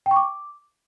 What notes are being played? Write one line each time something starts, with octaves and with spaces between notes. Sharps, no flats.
G5
C#6
D6